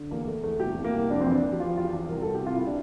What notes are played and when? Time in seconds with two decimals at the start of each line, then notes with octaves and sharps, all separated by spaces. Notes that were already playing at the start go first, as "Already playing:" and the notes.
Already playing: D3
0.11 E2 A#3
0.27 E2 A3
0.44 E2 A3
0.60 C2 G4
0.77 C2
0.84 A#3
0.94 C2
1.10 F2 D4
1.21 C4
1.26 E3 D4
1.43 E3
1.52 G4
1.60 F3 F4
1.77 E2 F4
1.84 G4
1.93 E2
2.09 C2 A#4
2.22 C2 A4
2.35 G4
2.42 C3 F4
2.56 C3 E4
2.67 D4